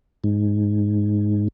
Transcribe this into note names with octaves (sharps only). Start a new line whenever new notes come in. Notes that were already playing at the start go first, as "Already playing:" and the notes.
G#2